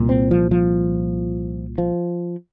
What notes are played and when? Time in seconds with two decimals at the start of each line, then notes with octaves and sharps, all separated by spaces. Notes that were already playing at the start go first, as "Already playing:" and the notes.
Already playing: C2 A#2
0.09 C4
0.31 F3
0.51 F3
1.78 F3